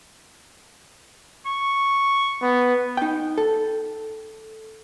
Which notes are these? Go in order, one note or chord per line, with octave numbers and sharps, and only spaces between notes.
C#6
B3
D#4 G5
A4